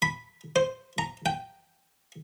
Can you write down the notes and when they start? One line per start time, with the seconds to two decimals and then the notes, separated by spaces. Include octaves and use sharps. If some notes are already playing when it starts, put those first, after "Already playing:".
0.02 B5
0.56 C5
0.98 A#5
1.26 G5